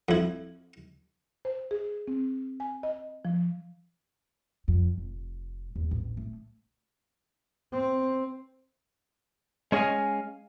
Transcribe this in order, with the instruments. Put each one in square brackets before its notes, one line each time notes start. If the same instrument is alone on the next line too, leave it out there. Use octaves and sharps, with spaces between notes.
[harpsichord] F2 E4
[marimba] C5
G#4
C4
G#5
D#5
F3
[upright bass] F2
F1
D#2
A1
A3
[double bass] C4
[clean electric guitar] G#3 C#4 G#4 D#5 F5 G#5